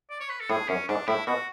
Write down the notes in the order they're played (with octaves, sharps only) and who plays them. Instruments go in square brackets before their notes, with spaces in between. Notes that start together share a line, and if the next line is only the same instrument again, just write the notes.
[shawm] D5
C#5
B4
A4
[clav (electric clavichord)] A2 [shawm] G#4
[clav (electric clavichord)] F#2 [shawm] C#4
[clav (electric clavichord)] G#2 [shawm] D4
[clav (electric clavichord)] A2 [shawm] E4
[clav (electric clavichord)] B2 [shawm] F#4